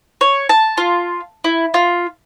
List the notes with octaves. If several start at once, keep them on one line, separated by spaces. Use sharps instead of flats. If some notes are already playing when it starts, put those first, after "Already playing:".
C#5
A5
F4
E4
F4